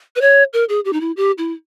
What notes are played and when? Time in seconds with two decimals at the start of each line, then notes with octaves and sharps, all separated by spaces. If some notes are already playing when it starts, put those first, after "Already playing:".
0.16 B4
0.21 C#5
0.53 A#4
0.69 G#4
0.85 G4
0.93 D#4
1.01 E4
1.17 G4
1.38 E4